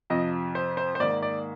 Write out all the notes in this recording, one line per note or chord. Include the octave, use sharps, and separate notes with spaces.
F2 C3 F3 D#5
C5
C5
C5
G#2 D#3 A#3 D5
D5